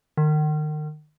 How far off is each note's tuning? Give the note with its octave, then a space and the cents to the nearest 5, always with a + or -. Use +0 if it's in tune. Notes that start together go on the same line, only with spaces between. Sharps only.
D#3 -35